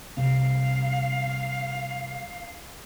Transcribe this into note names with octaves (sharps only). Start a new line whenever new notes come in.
C3 G3 C4 F5